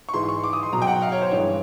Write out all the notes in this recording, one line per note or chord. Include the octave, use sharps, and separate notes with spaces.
C#6
G#2 E3 G#3 C6
C6
C#6
D6
D#6
C6
B2 F#3 A#5
G5
F#5
F5
C#5
C5
G2 E3 G#3 C#5